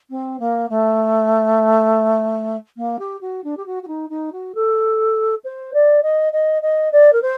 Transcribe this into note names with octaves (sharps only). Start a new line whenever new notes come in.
C4
A#3
A3
A#3
G4
F#4
D4
G4
F#4
F#4
D#4
D#4
F#4
A4
C5
D5
D#5
D#5
D#5
D5
A#4
C5